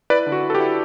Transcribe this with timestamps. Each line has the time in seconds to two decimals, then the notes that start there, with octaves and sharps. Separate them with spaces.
0.10 E4 B4 D5
0.26 D3
0.32 F#4
0.43 E4
0.50 A4
0.55 G4
0.60 E4